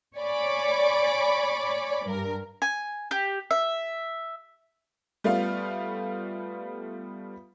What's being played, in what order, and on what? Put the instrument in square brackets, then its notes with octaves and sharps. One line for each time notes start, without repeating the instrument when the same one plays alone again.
[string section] C#5 D5 G#5 B5 D6
G2 A#4
[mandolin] G#5
G4
E5
[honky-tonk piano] G3 A3 B3 F4 F5